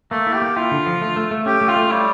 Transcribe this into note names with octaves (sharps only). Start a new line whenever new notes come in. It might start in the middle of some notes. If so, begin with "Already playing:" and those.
A3 A#3
E4
G4
A#3
E4 F4
D3
F3
A3
A3
A3
C#4 G4
A3
F4
A3
G3 C#5